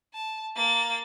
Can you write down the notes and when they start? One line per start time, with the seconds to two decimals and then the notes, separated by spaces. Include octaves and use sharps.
0.14 A5
0.55 A#3 A6